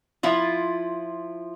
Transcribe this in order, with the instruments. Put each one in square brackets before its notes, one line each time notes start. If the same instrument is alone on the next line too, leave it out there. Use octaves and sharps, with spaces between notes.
[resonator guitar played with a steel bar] F3 E4 F4